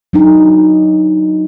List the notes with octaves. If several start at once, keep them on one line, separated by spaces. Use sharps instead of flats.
F#3 D4 D#4